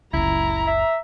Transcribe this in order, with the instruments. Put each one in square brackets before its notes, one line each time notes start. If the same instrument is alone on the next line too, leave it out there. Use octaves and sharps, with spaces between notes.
[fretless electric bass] F#1 C#2 [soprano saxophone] E4 [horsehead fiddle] A#5
[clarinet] E5